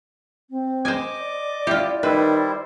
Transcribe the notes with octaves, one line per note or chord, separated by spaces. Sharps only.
C4
C5 D#5 G#5 D6
D5
E4 F4 G4
D#3 G3 E4 B4 C5